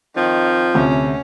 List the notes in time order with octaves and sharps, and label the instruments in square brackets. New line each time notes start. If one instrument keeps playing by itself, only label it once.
[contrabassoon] F2 [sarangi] D#3 [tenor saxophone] F3
[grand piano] D2 C3 [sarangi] C#4